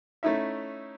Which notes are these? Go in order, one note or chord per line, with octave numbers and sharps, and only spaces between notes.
A3 C#4 D#4 E4 E5